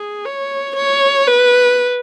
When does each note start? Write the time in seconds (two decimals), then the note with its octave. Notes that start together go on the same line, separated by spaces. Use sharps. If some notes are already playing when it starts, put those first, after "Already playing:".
Already playing: G#4
0.25 C#5
0.77 C#5
1.28 B4